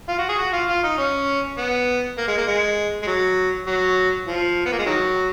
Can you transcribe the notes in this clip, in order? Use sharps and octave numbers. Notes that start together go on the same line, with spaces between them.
F4
F#4
G#4
F#4
F4
F4
D#4
C#4
B3
A#3
G#3
A#3
G#3
G#3
F#3
F#3
F3
B3
A#3
G#3
D#3 F#3